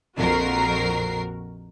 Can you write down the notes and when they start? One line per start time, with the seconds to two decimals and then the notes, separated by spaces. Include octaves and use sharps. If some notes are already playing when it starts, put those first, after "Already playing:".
0.17 A#1 F2 F#4 A#4 C7